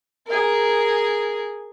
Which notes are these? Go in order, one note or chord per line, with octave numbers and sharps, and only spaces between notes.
G#4 A#4